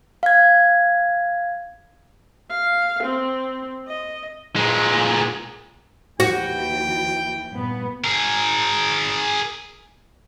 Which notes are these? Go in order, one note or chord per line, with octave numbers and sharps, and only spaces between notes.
F5 G#6
F5
C4
D#5
A#2 G#3
D#2 E3 F#4 G5
G2 A#2 B3
G#4 A#4